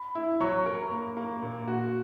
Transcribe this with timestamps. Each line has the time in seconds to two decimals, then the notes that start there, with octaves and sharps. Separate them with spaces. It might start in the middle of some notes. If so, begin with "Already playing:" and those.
Already playing: B5
0.15 E4
0.40 F#3 C#6
0.66 A#4
0.91 A#3
1.17 A#3
1.42 A#2
1.68 F#4